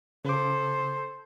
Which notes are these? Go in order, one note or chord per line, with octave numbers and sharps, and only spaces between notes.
C#3 A4 C5 D6